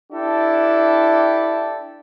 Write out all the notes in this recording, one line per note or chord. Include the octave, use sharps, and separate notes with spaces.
D4 E4 G4 A4